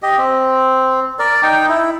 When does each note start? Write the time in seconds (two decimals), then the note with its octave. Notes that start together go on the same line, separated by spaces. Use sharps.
0.02 G4 D#5
0.18 C4
1.19 A#4 D5
1.43 D#4 G5
1.68 E4